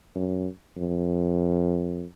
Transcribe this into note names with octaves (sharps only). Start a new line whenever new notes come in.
F#2
F2